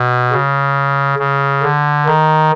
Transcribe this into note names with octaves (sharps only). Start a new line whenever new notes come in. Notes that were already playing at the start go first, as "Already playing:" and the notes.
Already playing: B2
C#3
C#3
D3
D#3